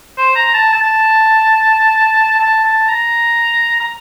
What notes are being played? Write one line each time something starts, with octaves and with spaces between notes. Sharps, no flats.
C5
A#5
A5
A5
A5
A5
A#5
A#5